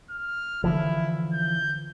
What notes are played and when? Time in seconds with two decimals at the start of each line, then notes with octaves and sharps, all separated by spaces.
0.11 F6
0.64 D3 E3 F3 E4
1.33 G6